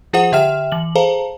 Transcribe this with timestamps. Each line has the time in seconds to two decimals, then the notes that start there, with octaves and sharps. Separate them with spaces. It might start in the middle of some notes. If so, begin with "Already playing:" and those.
0.13 F3 F4 G#4 C5 F#5 D#6
0.32 D3 G4 E5 G5 F6 E7
0.72 E3 F#7
0.95 G#4 A4 C5 F5 A5 A#5